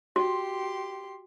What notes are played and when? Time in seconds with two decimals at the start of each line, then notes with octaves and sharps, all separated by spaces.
0.16 F#4 G4 C6